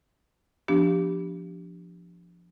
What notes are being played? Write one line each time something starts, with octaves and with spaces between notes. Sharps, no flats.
F3 B3 D4 G4